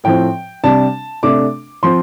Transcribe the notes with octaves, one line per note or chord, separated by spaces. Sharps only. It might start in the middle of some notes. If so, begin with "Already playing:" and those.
A2 F3 C4 G5
C3 G3 D4 A5
C3 A3 D4 D6
F3 C4 C6